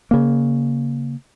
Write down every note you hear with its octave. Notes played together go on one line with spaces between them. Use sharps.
C#3 A#3